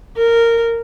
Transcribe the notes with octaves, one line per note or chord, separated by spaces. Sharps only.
A#4